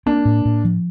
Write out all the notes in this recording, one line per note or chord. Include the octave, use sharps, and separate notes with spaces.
A#3 C4 D4
A2
A2
F3